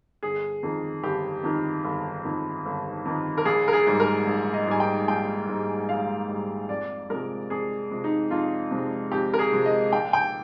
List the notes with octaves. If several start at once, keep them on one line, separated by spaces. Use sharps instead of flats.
G1 G#4
F2 D#3
G1 G4
F2 D#3
G1
F2 D#3
G1
F2 D#3
A#4
A#1 G#4
A#4
G#4
G#2 G3
A#4
A#1
D#5
G#2 G3 G#5
G5
A#1 G5
G#2 G3
A#1 F5
G#2 G3
F2 D5
C3 F3 G#3 A#4
F2 G#4
C3 F3 G#3
D#4
F2 F4
C3 F3 G#3
F2 G4
A#4
G#4
C3 F3 G#3
D#5
A#1 G5
G5